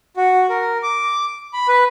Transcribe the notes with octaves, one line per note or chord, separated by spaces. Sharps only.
F#4
A#4
D6
B5
B4